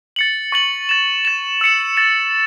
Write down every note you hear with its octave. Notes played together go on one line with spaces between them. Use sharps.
A6 C#7 F#7
C#6 A6 F#7
A6 E7
A6 E7
E6 C#7 E7
A6 E7